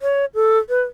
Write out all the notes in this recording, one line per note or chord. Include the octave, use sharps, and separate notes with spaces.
C#5
A4
B4